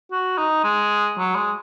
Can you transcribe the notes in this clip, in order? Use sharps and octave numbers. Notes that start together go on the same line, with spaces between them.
F#4
D#4
G#3
F#3
G#3